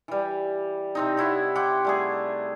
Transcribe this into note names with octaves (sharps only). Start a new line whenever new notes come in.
E3 G3
C3 C4 D#4
C3 E4 C#5 F#5
F#5 G5 C6 D6
G3 A3 G#4